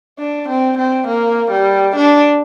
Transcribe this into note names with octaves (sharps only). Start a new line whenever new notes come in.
D4
C4
C4
A#3
G3
D4